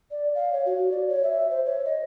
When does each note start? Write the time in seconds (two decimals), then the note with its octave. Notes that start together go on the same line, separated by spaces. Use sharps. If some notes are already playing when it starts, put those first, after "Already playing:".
0.11 D5
0.35 F5
0.53 C#5
0.66 F#4
0.92 D5
1.08 C#5
1.23 E5
1.50 C5
1.66 C#5
1.85 D#5